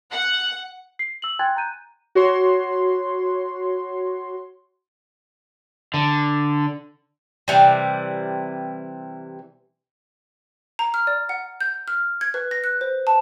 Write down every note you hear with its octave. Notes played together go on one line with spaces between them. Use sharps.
F#5
C7
E6 F#7
G5 G#5 C6 F#6 G#6 A6
A#5 F#6 G6 D#7
F#4 C#5 C6
D3
C3 E3 G3
A#5
F6
D5
F#5
G6
F6
G#6
B4
A#6
F#6
C5
A5